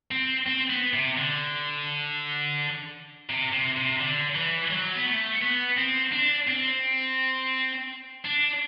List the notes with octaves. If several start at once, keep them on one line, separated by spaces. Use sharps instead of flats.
C4
C4
B3
C3
D3
C3
C3
C3
D3
E3
F#3
B3
A3
B3
C4
D4
C4
D4